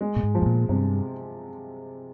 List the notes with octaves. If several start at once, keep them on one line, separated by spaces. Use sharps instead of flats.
G#3
A#2
G#2
F3
G#2
A#2
G2 C3